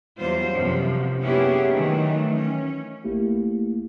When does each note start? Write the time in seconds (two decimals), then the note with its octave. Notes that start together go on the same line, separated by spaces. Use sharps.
0.17 E2 F#3 G3 F4 C5
0.55 F#2 C3 F3
1.22 A#3 B3 C#4 E4 G4 G#4
1.72 D#3 E3 F#3 A3
2.34 C#4
3.04 A1 A3 A#3 E4 G4